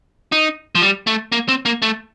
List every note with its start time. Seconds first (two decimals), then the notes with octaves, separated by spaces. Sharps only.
0.32 D#4
0.75 F3
0.82 G3
1.07 A3
1.32 A#3
1.48 C4
1.65 A#3
1.82 A3